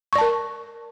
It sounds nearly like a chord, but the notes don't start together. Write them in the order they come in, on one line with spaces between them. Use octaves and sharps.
C#6 D5 A5 A#4